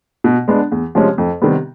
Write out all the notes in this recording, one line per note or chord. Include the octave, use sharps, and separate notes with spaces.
B2
G#3 B3 D4
E2
C3 F3 G#3 C#4
F2
C3 D#3 G3 B3